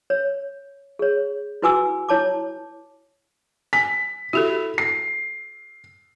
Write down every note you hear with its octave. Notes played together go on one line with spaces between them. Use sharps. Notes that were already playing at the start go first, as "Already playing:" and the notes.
C#5
G#4 C#5
E4 F#4 B4 G#5 D6 E6
E4 C#5 A5 D6
G#5 B6
E4 F#4 G4 A4
C7